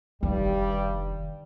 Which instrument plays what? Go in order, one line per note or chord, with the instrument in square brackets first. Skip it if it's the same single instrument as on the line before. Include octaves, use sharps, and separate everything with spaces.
[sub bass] F1 [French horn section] G2 G3 [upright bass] D#3